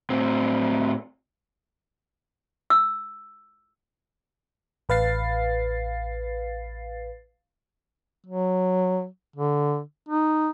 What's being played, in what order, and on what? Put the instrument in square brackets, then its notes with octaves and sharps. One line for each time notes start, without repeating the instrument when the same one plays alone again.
[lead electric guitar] A2 C4
[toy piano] E6
[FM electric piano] A1 B4 F5 A6 C7
[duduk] F#3
D3
D#4